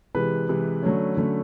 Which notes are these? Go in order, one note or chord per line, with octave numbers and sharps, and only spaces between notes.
C3 E3 G#3 B4
C3 E3 G#3
D3 F#3 A3 C#4
D3 F#3 A3 C#4